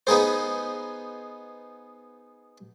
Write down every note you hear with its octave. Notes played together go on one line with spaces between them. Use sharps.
B3 D#4 G#4 C5